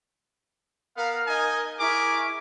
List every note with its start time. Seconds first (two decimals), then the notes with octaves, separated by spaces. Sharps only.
0.96 B3 A#4 F5
1.27 D#4 D#5 G#5
1.80 E4 G#4 A#4 G#5 C#6 D6